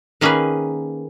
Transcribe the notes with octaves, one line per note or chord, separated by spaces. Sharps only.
D#3 A#3 C#4 G#4 B4